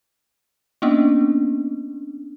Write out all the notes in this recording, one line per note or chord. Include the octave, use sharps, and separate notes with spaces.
A#3 B3 C#4 D4